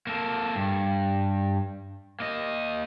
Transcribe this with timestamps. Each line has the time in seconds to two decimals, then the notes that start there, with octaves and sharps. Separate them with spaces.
0.07 A#3 A4
0.55 G2
2.20 A#3 D#5